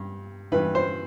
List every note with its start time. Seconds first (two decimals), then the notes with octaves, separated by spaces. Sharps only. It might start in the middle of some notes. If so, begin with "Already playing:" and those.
Already playing: G2
0.52 G2 E3 B4
0.75 C5